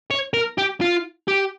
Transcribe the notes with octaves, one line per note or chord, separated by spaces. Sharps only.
C#5
A#4
G4
F4
G4